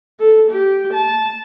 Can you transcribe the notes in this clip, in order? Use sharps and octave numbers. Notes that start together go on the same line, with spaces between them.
A4
G4
A5